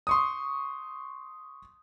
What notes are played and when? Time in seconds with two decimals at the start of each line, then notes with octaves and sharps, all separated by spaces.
0.07 C6 C#6 D#6